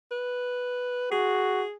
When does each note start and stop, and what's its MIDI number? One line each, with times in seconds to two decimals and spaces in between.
0.11 1.08 71
1.11 1.64 66
1.11 1.74 68